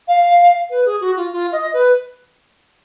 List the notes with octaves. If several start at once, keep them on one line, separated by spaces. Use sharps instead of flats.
F5
B4
G#4
F#4
F4
F4
D#5
B4